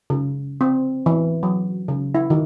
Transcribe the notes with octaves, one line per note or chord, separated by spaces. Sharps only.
C#3
C4
E3
F#3
C#3
E4
D#3